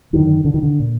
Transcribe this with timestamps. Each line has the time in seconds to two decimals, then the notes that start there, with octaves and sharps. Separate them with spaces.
0.13 F#2 D3 D#3
0.45 D3
0.54 D#3
0.63 D3
0.80 A#2